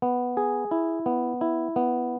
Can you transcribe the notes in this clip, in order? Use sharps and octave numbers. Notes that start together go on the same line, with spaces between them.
B3
G#4
E4
B3
E4
B3